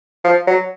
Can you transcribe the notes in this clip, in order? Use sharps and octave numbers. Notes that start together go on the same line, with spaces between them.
F3
F#3